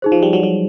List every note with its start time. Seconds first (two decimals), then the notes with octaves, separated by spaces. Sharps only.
0.02 D#4 G#4 C5
0.12 F3
0.23 G3
0.33 F#3
0.43 F#3